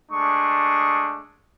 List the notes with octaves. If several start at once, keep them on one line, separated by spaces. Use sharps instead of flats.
G#3 A3 D4 C#6 D#6